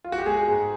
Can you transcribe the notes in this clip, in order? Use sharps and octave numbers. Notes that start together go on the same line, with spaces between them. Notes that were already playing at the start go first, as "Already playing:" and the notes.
F4
F#4
G4
G#3 G#4
G#2